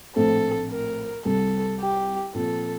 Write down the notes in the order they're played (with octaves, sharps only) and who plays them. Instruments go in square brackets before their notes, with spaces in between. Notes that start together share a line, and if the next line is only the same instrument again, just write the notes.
[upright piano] A#1 A2 A3 C4 [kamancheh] A4
[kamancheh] A#4
[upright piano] C2 C3 G3 [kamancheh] A4
[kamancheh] G4
[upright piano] A#2 F3 C4 [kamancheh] A4